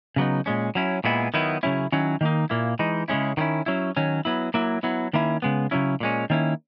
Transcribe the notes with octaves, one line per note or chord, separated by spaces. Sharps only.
C#3 F#3 B3 D#4
A#2 G#3 C#4
F#3 C#4 E4
A#2 G#3 B3 E4
D#3 F#3 B3 E4
C#3 F#3 C#4 E4
D#3 F#3 C#4 E4
D#3 A#3 D#4
A#2 A#3 E4
E3 G#3 D#4
C#3 G#3 C#4 E4
D#3 F#3 C#4 E4
F#3 C#4 E4
D#3 F#3 C#4
F#3 B3 E4
F#3 A#3 E4
F#3 B3 E4
D#3 A#3 C#4 E4
C#3 G#3 B3
C#3 F#3 C#4 E4
A#2 G#3 C#4
D#3 A#3 C#4 E4